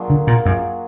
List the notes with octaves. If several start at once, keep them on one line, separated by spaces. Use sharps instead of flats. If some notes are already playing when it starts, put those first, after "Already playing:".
Already playing: F#3 A#3 D4 F4 G#4
D3
A#2
F#2 F#3 A#3 F4 G#4